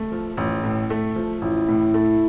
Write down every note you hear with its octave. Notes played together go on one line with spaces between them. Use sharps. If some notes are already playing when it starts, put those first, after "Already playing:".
Already playing: A3
F3
A1
A2
A3
F3
A1 E4
A2
A3